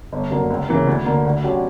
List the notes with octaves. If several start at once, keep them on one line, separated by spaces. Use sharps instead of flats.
G1
F#2 D3 A#3
C#2
C#3 E3 A#3
D2
D3 A#3
D2
D3 F#3 C#4 G4